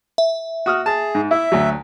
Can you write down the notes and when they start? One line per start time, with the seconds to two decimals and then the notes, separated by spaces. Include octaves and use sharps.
0.18 E5
0.66 F#4 D#6 F6
0.86 G#4 A5
1.15 G#2
1.31 E4 E5
1.52 D2 F#3